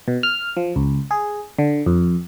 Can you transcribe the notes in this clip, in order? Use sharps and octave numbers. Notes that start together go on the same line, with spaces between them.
B2
F6
F3
C#2
G#4
D3
F2